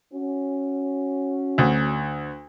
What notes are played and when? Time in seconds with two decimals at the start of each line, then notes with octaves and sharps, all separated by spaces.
0.14 C#4 F#4
1.58 D2